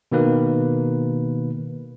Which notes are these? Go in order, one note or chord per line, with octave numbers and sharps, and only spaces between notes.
B2 D#3 A#3 B4